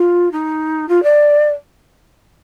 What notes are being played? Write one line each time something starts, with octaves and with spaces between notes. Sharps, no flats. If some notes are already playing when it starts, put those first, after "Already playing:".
Already playing: F4
D#4
F4
D5